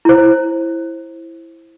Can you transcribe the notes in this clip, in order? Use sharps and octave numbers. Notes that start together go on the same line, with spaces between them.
E4 C5